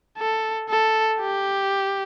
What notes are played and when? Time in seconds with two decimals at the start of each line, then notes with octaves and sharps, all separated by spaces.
0.18 A4
0.69 A4
1.20 G4